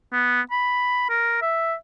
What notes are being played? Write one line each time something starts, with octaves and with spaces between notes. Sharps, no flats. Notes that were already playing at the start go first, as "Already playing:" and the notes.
B3
B5
A#4
E5